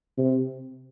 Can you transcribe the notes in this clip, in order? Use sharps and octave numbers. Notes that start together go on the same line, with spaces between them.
C3